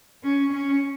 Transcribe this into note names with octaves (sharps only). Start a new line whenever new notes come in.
C#4
C#4